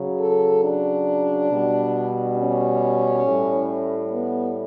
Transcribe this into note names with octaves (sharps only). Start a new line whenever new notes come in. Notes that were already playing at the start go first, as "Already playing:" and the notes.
Already playing: C#3 F#3
A4
D4
B2 G3
C#4
A2 G3
B3